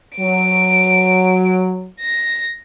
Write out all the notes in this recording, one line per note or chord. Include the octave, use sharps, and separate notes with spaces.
F#3 D7
A#6